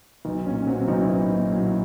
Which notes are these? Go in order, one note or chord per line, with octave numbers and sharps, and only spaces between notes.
B1 D#4
A#2 C#4
F#3 C4
B1 D#4
E4
B1
A#2
F#3 E4